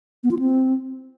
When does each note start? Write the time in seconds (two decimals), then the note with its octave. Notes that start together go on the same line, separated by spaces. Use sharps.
0.24 B3
0.31 F4
0.39 C4